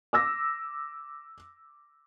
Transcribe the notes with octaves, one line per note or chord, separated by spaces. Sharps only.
D6 E6 A#6